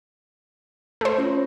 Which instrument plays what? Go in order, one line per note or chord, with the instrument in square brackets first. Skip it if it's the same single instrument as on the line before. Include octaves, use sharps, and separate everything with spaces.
[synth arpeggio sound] A3 C5
[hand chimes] C#4 F4 C#5